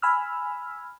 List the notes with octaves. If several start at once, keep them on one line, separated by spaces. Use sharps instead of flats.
G#5 B5 E6 F6